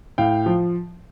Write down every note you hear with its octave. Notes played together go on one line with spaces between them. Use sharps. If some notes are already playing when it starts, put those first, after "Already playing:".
A2 F5 G5
F3